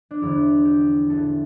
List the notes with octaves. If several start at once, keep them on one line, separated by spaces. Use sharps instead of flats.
D4
E1 E2 D3 F3 E4
G4
A1 A2 E3 A4